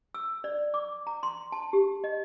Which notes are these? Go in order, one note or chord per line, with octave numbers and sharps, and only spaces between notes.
E6
D5
D6
A#5
C6
A5
G4
D#5